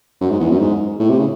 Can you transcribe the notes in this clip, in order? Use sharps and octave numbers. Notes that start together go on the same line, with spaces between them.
F#2
G#2
E2
F#2
G#2
A2
C3
C#3